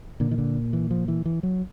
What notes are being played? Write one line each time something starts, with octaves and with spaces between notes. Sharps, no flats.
A#2 D3
D#3
D3
E3
F3
E3
E3
F#3